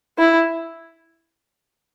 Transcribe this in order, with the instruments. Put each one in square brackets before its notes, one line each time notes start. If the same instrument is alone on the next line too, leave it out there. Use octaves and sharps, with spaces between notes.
[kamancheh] E4